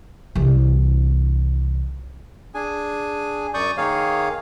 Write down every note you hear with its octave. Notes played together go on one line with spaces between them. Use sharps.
C2 E3
D4 G#4 G#5
F#2 D5 C#6 D#6 G6
D#3 A#3 G#4 C#5 F5